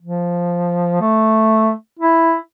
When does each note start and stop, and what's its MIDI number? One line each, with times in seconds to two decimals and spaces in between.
0.01 0.98 53
1.01 1.71 57
1.99 2.36 64